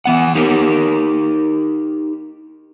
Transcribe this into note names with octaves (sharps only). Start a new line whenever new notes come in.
E3 B3 F#5
D#4 G4 A#4